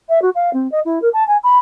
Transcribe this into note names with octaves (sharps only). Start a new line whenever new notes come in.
E5
F#4
F5
C4
D#5
E4
A#4
A5
G#5
B5